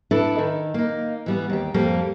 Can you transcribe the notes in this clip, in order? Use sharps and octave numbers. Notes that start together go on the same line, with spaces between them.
D4 E4 A4 B4
D#3
A#3 D#4
E3 G3 B3
D#2 G4
F2 G3 A#3 G4 A4